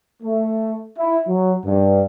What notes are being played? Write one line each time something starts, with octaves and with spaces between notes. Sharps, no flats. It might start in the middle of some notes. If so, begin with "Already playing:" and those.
A3
E4
F#3
G2